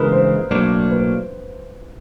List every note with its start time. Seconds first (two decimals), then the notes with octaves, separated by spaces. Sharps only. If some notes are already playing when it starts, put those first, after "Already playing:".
Already playing: C#3 E3 G#3 A#4 B4
0.12 C5
0.51 B1 A2 F#3 A#3 D4
0.91 B4